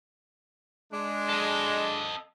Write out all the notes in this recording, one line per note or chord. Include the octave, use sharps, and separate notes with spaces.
G#3 D4
A4 D#5